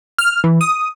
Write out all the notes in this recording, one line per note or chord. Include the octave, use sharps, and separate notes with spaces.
F6
E3
D#6